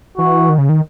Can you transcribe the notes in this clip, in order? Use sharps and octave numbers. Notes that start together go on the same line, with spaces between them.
E3 F#4
D#3
C#3
D#3